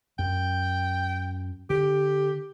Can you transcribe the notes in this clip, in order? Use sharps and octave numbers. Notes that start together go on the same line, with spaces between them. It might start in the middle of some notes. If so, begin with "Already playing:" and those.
F#2 G5
D3 G4